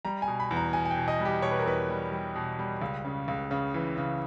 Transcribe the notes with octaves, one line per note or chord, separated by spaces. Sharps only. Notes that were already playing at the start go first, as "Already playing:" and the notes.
G3 A#5
G#5
B2
B5
E2
A#5
B2 G#5
G#5
G5
B2
D#5
G3
G4
B2 C#5
B4
A#4
E2 B4
G3
G3
B2
G3
C#2
C#3
C#2
C#3
E3
C#3